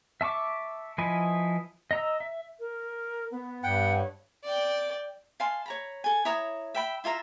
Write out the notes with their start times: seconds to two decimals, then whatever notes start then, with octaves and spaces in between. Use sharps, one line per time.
0.21 E5 A5 C#6 D6
0.98 F3 E4 B4 D#5 G#5
1.91 D#5 A#5 E6
2.20 E5
2.60 A#4
3.31 B3
3.63 G2 F#5 G5
3.97 C#5
4.44 D5 G5
5.40 F5 G#5 A5 C6
5.66 C#5 A#5 B5
6.04 A4 G#5
6.25 E4 C#5 A#5 D#6
6.75 E5 G5 B5
7.04 E4 F4 E5 A#5